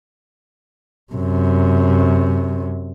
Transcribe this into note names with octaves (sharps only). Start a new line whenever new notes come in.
F#2 C3